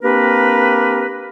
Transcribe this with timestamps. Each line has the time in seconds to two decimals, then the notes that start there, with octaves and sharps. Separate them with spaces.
0.02 A#3 C4 D4 G4 A#4 B4